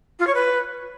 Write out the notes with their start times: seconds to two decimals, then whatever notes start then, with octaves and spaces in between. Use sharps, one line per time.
0.19 F4
0.27 C#5
0.34 B4